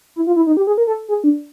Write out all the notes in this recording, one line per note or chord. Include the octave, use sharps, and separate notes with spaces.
E4
F4
E4
D#4
G4
G#4
A#4
A4
G#4
D4